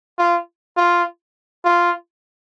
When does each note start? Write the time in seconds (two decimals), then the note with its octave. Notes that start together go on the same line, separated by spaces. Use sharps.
0.18 F4
0.77 F4
1.65 F4